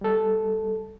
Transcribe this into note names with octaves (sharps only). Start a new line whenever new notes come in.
G3 A4